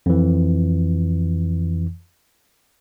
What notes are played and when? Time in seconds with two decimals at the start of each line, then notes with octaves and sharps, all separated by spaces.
0.06 F2 E3